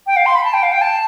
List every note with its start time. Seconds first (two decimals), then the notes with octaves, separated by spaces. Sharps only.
0.07 G5
0.16 F5
0.26 C6
0.35 B5
0.44 A5
0.53 G5
0.63 F5
0.72 G5
0.81 A5